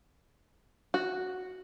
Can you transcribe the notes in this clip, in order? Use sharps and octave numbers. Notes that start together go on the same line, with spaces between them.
F#4